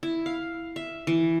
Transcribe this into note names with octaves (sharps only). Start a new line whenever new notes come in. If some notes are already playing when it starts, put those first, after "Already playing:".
E4
F5
E5
E3